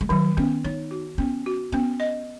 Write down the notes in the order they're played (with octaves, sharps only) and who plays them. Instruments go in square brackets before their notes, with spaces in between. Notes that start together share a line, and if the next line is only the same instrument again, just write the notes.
[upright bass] G#3
[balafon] D#3 [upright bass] F#3
[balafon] B3 [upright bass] C#4
[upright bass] D#4 [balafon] C#5
[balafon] F#4
[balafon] B3 [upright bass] C#4
[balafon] F#4
[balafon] B3 [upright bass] C#4
[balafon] D#5